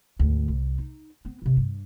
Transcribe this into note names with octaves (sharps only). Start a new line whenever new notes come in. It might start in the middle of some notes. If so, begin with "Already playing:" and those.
G#1 D2
C2
D#4
B3 C4
A1 C3
G2